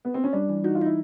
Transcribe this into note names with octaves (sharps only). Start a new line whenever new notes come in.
B3
C4
C#4
G3 D4
E3
D#4 F#4
F4
D#4 E4